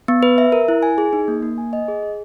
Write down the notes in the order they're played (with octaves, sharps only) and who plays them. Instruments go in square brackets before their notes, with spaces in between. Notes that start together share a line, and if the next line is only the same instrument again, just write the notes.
[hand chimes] B3
B4
E5
A#4
E4
G#5
G#4
D#4
A#3
A#3
G#5
D#5
G#4
G#4